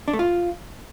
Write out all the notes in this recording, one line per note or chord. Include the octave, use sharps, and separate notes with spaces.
D4
A3
F4